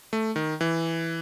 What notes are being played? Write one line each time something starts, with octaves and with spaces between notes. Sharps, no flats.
A3
D#3
E3